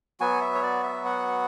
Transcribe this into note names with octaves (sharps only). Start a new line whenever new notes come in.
F#3 B3 F#4 G#5
E5
C#5
D5
E5
F#5